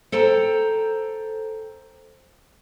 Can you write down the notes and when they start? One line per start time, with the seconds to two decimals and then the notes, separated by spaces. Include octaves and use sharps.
0.12 A4 C5 G5 A#5